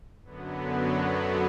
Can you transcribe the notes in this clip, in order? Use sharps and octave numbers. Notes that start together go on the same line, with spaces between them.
F#2 D3 F#3 B3